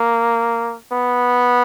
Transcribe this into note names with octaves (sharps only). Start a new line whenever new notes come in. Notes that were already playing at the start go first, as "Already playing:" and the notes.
Already playing: A#3
B3